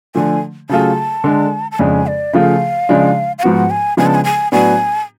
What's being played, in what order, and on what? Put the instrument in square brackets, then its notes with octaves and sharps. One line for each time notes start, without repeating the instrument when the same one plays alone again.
[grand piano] D3 F3 A3 [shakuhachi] G#5
[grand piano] C#3 F#3 A3 F4 G#4 [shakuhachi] A5
[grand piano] D3 G#3 D4
[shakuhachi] A5
[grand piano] F2 C#3 G#3 D4 [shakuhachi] G#5
[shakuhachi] D5
[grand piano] C#3 F3 A3 F4 G#4 [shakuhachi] F5
[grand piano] C#3 F3 G#3 D4
[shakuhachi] F5
[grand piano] G#2 F3 B3 F#4 [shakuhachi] F#5
[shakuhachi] G#5
[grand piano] C#3 F3 G#3 B3 D4 [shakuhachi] G#5
[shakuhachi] A5
G#5
G#5
[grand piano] A2 F#3 B3 D4 F#4 [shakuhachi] G#5